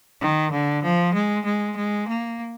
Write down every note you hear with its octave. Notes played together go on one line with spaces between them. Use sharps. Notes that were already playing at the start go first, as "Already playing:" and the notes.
D#3
D3
F3
G#3
G#3
G#3
A#3